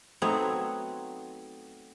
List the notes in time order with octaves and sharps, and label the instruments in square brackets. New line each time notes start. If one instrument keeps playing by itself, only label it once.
[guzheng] F#3 A3 B3 C4 D#4 C#5